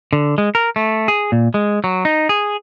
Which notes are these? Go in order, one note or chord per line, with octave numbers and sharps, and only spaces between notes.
D3
G#3
A#4
A3
G#4
A#2
G#3
F#3
D#4
G#4